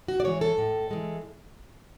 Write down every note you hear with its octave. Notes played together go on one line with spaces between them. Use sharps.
F#4
D5
E3 G#3 C#5
A4
A2
E3 G#3